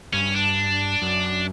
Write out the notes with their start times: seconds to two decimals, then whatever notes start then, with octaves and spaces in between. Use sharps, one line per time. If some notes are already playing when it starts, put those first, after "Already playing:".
0.13 G2 C#4
0.35 D4
1.02 F#2